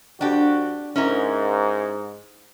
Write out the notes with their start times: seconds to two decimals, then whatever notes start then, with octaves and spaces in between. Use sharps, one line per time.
0.21 F2 D4 F#4 G4
0.96 G#2 C#4 E4 A#4